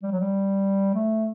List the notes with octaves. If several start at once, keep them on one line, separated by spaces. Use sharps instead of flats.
G3
F#3
G3
A3